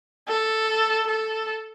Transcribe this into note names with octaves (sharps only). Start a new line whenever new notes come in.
A4
A4